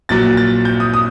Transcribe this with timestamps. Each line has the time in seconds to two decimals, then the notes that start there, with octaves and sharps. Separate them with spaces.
0.09 A#1 A#2 F#3 A6
0.37 A6
0.65 G6
0.80 D#6
0.94 D#6